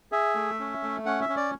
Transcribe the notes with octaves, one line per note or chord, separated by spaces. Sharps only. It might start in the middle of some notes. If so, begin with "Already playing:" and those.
G#4 E5
A3
C#4
A3
C#4 F#5
E5
C#4
D5